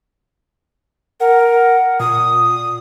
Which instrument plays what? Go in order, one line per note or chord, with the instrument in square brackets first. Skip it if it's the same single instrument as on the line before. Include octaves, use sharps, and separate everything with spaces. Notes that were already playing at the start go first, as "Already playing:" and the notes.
[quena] A#4 [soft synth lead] F#5
[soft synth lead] A#2 [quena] D#6